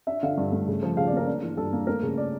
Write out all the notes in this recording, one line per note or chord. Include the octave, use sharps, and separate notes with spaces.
D4 E5
D3 F5
G2
A3
C#3
F3
C#3 F5
D5
A#3 A#4
D4
E3
G2 A4
A#3
A3 A#4
C#3
D5